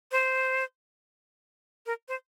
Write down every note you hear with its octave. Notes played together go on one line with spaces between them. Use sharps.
C5
A#4
C5